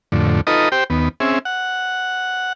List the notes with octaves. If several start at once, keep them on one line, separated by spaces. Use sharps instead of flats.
F2 A2 D3
D#4 F4 A4 B4 D#5 A#5
G4 C5 G5
D#2 B3
C4 C#4 G#4 E5
F#5